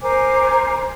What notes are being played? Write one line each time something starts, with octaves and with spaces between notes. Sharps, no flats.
A#4 C5 G#5 D6